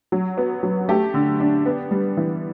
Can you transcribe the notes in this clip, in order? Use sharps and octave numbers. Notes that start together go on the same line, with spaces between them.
F#3
B3
F#3
A3 G4
D3
D4
B3
G3
E3